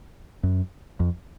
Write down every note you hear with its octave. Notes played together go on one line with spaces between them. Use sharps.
F#2
F2